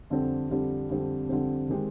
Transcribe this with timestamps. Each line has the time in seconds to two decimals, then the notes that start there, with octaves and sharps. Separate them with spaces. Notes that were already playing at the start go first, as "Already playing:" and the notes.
0.10 F2 D3 G3 C4
0.49 F2 D3 G3 C4
0.90 F2 D3 G3 C4
1.29 F2 D3 G3 C4
1.69 D#3 G#3 C4 G4